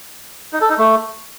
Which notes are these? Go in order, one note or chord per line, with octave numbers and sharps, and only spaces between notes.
D#4
A4
D#4
A3